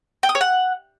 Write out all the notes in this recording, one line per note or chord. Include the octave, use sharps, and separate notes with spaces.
G5
D#6
C#5
F#5